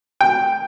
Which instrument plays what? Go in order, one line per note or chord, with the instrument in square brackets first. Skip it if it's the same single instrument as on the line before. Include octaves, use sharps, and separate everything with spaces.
[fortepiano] G5